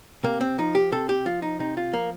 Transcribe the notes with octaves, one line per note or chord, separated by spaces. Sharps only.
C3 A#3
C4
F3 D#4
G4
C3 A4
G4
F3 F4
D#4
C3 D#4
F4
F3 A#3